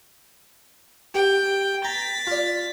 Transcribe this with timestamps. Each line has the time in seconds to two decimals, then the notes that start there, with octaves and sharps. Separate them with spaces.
1.14 G4 G5
1.85 A#5 A6 B6
2.27 F4 D5